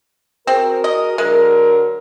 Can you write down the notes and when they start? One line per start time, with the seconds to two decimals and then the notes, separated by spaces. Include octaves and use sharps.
0.47 C4 F#4 G#4 A#4
0.84 D#5
1.18 D3 F#3 G#3 A#4